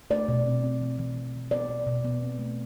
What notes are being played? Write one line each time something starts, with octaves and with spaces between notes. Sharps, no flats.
A3 D5
B2
C4
C4
E3
E3
E3
E3
B3 D5
B2
B2
B3
C4
A3